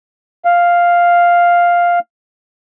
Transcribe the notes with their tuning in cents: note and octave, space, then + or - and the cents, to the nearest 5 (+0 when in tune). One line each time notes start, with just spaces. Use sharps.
F5 +0